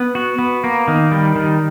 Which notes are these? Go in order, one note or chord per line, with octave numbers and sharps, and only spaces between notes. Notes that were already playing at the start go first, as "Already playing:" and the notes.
Already playing: B3
F#4
B3
A#3
D#3
G3
D#3